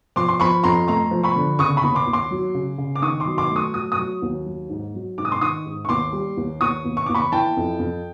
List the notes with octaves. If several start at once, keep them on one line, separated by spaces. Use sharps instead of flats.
F3 C6 D6
C6
F3 B5 C#6
F2 A#5 C6
A3 A#5 C6
F3
B5 C#6
D3
C#3 C#6 D#6
B5 C#6
D#2
C6 D6
D#2
C6 D6
F#3
C#3
C#3
D6
D#3 C#6 D#6
C6 D6
F#3
C6 D6
A3
C#6 D#6
F#3 D#6
C#6 D#6
F#3
D#2
F#3
G#2
F#3
G#2 D6
D#6
C6 D6
D#3 C#6 D#6
G#2
C#6
D#2 C6 D6
G3
D#2
D#2 C#6 D#6
D#2
C#6
D#2 D6
B5 C#6
E3 G5 A5
F2
F2